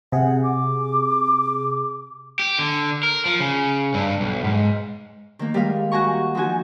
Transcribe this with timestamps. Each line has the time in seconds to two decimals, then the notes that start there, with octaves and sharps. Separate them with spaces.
0.12 C3 G#4 F#5
0.43 D6
2.40 G4
2.59 D3
3.03 A#4
3.25 F3
3.40 C#3
3.94 G2
4.21 B1
4.44 G#2
5.39 D#3 A#3
5.54 G3 G#3 A#4 F5
5.92 F#4 G4 G#5 A#5 C#6
6.35 F3 D#4 F#4 G#5